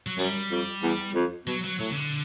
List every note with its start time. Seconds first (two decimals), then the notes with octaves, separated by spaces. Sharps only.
0.07 F#3
0.18 F#2 G3
0.51 F2
0.83 E2
1.15 F2
1.47 B2 F#3
1.64 F#3
1.79 A2 F#3
1.91 C#3
1.97 D3